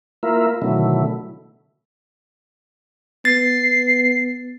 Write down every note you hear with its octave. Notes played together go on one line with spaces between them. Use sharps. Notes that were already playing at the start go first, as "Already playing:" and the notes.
A#3 E4 F4 A#4 E5
B2 D3 D#3 F#3 A3 E4
B3 A6 C7